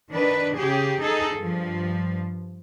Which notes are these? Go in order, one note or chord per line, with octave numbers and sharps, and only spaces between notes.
D#3 D4 B4
C#3 G4 G#4
D#4 G#4 A4
G2 F3